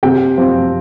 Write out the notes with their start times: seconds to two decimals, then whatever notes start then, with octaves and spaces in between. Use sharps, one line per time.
0.03 C3 G5
0.37 F3 C4